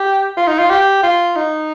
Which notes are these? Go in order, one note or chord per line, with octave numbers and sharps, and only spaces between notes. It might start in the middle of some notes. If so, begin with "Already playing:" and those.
Already playing: G4
F4
D#4
F4
G4
F4
D#4